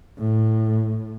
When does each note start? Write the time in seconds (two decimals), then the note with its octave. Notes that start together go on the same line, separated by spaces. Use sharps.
0.18 A2